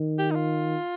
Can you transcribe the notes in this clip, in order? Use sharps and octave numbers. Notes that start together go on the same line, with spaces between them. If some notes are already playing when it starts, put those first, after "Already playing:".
Already playing: D#3
G4
D#4
F4